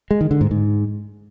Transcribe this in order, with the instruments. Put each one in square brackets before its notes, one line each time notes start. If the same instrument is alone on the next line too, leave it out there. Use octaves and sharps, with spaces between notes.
[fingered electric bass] G#3
D#3
D3
G#2
G#2